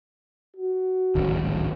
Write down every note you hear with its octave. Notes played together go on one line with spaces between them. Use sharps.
F#4
D1 G#1 C#2